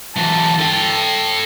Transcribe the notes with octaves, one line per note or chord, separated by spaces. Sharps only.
E3 F#3 A5
A4 G5